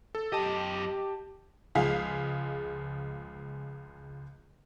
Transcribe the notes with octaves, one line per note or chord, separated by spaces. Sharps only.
A4
F#2 G4 D#5 A5
C#2 F3 G#3 G#4 F5 B6